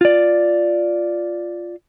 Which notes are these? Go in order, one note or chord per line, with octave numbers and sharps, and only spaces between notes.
F4 D5